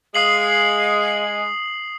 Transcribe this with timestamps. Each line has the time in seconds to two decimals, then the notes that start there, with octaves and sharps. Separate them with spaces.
0.15 G#3 F5 D#6 C7 F#7